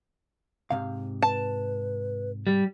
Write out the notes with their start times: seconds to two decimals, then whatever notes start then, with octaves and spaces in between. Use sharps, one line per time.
0.71 G#2 C3 F5
1.22 B4 A5
2.47 G3